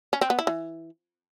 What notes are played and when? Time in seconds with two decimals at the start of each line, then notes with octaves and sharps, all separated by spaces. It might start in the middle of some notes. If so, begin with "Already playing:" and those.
0.13 C#4
0.21 C4
0.30 B3
0.39 E4
0.47 E3